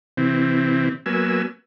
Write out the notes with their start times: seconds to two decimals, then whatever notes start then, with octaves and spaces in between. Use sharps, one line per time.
0.17 C3 E3 C4
1.06 F#3 A#3 B3 G#5 E6